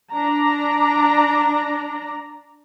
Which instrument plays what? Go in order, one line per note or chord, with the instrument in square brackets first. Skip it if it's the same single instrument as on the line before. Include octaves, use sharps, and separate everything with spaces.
[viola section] D4 D5 A#5